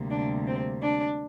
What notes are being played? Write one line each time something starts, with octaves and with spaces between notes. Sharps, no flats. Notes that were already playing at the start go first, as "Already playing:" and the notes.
Already playing: D2 C3 G3 A#3
D4
C4
D4